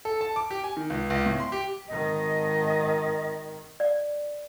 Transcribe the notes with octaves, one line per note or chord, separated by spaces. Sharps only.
A4
A5
D6
G4
G#5
D#3
C#2
C#2
A2
C6
G4
G#1 D#3 D#5
D5